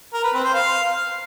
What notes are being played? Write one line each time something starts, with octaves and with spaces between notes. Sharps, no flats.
A#4
B4
C4
C5
F5